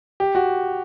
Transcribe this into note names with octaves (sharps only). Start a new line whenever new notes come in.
G4
F#4